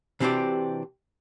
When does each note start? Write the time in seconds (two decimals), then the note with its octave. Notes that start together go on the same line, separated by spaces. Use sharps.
0.20 C3 E3 C4 D4 F#4 G4